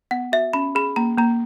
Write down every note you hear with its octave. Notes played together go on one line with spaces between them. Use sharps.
B3 F#5
F#4 E5
C#4 B5
G#4 B5
A#3 A#5
A#3 A#5